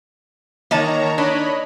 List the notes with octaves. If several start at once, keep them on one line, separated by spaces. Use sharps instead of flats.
D#3 A#3 C#5 D#5 A5 A#5
D4 C#5 D#5 B5